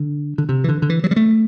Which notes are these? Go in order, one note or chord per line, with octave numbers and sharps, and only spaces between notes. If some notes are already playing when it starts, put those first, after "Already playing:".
Already playing: D3
D3
C3
E3
D3
D3
E3
F#3
G3
A3